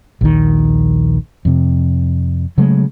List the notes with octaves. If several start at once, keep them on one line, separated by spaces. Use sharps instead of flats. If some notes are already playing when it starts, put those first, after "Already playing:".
A#1 D#2 D#3
F2 C3
C#3 F#3 G#3 A3